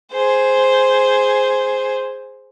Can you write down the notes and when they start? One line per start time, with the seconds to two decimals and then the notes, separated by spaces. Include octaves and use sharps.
0.12 G#4 C5